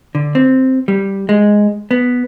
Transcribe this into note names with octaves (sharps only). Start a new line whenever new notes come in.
D3
C4
G3
G#3
B3